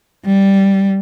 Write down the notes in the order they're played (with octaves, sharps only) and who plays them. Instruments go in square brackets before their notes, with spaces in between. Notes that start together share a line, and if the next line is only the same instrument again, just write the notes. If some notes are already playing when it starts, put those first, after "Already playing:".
[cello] G3